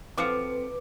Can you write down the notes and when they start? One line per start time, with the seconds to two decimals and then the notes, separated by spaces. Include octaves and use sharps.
0.18 F3 C4 F4 F#4 A4 B4 D6 C#7